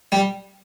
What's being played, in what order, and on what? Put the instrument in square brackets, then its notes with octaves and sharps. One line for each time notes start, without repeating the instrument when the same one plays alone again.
[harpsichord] G3